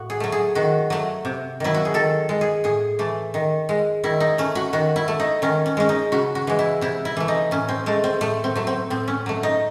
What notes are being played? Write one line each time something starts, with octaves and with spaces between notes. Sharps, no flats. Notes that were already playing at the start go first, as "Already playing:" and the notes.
Already playing: A2 F#4
G#4
F#3 A3
G#4
D#3 F#4
F#3 A3
C3
D#3 F#3 E4
F#4
G#4
D#3 A4
G#3
G#4
A2 G#4
E3 A3
D#3
G#3
D#3 E4
D#4
A3 C#4
F#4
D#3 F#4
E4
A3
D#4
D#3 C#4
C#4
G#3 C#4
D#4
C#3 F#4
F#4
E3 G#3
E4
C3 E4
E4
E3 A3
D#4
A2 C#4
C4
G#3 A3
C4
A2 A3
C4
F#3 A3
C4
A2 C4
C#4
F#3 A3
D#4